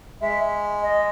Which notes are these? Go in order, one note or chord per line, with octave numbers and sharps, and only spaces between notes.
G#3 E5
D#5